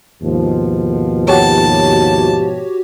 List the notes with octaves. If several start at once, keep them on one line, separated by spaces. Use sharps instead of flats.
D#2 G#2 B2 F3
F#4 G4 C#5 A5